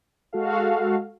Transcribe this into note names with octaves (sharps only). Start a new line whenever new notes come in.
G#3 F#4 A4 F5